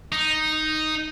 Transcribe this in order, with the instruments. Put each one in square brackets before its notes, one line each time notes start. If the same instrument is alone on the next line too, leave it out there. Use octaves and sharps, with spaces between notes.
[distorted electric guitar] D#4